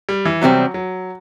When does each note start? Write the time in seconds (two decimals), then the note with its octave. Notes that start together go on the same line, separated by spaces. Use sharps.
0.09 G3
0.25 E3
0.41 E2 C3 F#3 G3 C4
0.74 F#3